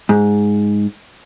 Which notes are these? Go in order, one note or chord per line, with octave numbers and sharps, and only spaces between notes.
G#2